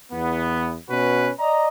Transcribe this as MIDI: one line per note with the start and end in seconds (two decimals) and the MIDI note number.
0.12 0.75 40
0.12 0.75 59
0.89 1.29 47
0.89 1.29 61
0.89 1.29 66
0.89 1.29 71
1.39 1.67 74
1.39 1.67 75
1.39 1.67 82